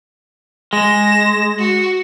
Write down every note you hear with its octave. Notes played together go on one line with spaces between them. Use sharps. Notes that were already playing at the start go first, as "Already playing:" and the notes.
G#3 A#6 E7
F#4